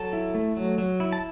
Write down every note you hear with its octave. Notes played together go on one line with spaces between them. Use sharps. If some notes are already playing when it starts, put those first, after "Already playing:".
Already playing: F#3 A4 A5
E4
A3
F#3
F#3
E4
A5